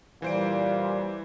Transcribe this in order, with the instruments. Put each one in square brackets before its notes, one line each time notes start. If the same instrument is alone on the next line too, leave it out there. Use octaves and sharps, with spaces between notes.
[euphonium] A#2 [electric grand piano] E3 C5 D7 [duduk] G3